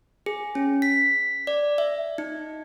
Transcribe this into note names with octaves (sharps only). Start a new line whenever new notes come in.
G#4
C#4
B6
D5
E5
D#4